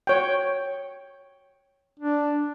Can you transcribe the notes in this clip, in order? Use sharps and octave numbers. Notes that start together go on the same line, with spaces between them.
C#5 G5
D4